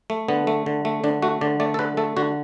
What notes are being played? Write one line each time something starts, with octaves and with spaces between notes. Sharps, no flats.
A3
D3 B3
A3
D3
A3
D3 D4
A3 F#4
D3 D5
A3 D5
A4
D3 B4
A3 A4
D3 F#4